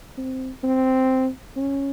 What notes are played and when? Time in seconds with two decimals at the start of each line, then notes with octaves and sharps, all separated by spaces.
0.18 C4
0.64 C4
1.57 C#4